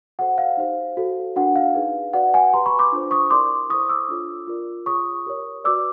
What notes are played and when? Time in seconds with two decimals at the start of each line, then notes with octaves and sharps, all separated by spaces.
0.19 F#4 A4 C5 F#5
0.38 F5
0.57 D#4 G4 C5
0.97 F#4 A4 C5
1.36 D4 F#4 A#4 F#5
1.55 F5
1.74 D#4 G#4 B4
2.13 F#4 B4 D5 F#5
2.34 F#5 G#5
2.53 G4 B4 D5 A#5 C6
2.66 B5 C#6
2.79 C6 D6
2.92 D4 F4 A4 C5
3.11 C#6 D#6
3.30 E4 G4 A#4 D5 C6 D6
3.69 E4 A4 C5 C#6 D#6
3.89 D6 E6
4.08 D4 F4 A4 C#5
4.47 F4 A#4 D5
4.86 F4 G#4 C#5 C#6 D#6
5.26 G4 A#4 C#5
5.64 F#4 B4 D5 D6 E6